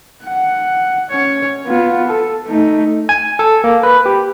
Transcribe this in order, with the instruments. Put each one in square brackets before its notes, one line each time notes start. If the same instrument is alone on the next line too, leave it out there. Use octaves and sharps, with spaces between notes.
[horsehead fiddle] F#5
C#4 C#5
B3 F4
A4
A3 D#4
[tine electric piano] G#5
A4
A#3
B4
G4